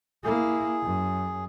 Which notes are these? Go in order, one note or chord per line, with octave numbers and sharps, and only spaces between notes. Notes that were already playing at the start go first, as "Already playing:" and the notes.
A#3 E4 G#4
F#2